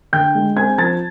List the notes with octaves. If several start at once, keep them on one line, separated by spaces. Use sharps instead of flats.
D3 G5 G6
G#3
C4 G#5 G#6
F3 A5 A6